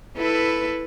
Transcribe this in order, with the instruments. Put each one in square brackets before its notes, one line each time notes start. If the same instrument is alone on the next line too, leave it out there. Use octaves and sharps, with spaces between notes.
[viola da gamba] E4 A4 B4